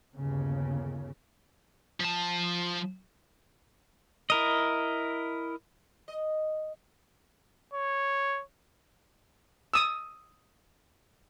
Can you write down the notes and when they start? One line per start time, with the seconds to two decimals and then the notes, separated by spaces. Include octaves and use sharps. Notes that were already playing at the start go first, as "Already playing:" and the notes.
0.17 G1 D#2 C#3
2.00 F3 A5
4.30 E4 A#4 D#5
6.08 D#5
7.73 C#5
9.74 D#6 E6